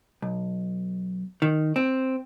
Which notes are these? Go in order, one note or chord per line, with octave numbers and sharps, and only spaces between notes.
B1
D#3
C4